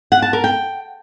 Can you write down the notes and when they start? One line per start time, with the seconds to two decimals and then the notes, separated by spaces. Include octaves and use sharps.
0.12 F#5
0.22 A5
0.33 A#4
0.44 G5